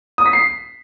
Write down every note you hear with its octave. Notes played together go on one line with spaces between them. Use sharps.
D#6
B6
C7